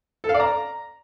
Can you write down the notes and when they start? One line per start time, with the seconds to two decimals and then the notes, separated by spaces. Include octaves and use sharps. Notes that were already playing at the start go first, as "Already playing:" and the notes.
0.24 A4
0.29 F5
0.34 D5
0.40 A#5